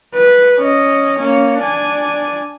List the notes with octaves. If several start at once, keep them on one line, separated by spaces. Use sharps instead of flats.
B4
C#4 D#5
A#3 C#4
D4 G#5